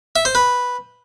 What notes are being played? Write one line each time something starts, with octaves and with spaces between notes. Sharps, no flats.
E5
C5
B4